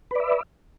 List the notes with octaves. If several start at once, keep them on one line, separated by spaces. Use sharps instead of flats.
B4 D5 E5